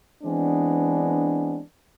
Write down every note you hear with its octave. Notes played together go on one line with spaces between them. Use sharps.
E3 G#3 B3 C4 D4